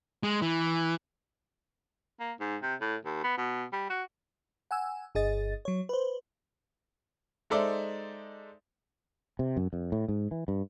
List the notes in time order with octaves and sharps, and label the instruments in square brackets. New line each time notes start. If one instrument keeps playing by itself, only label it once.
[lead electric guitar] G#3
E3
[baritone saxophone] A#3
G#2
C3
A2
D#2
B3
B2
G3
F#4
[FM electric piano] F#5 G#5 E6
G1 G#4 D#5 A6
F#3 C#5
B4 C5
[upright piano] G#3 D#4 A4 C5 D5 E5
[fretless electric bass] C3
F#2
F2
A2
G#2
E3
G2